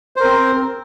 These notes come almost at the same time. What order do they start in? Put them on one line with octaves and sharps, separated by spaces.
C5 A#4 C4